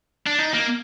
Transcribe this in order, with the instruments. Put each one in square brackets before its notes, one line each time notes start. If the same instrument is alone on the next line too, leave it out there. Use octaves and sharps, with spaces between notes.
[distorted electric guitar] D4
D#4
A#3